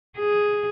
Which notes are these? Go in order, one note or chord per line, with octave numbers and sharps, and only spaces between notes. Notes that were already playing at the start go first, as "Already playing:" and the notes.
G#4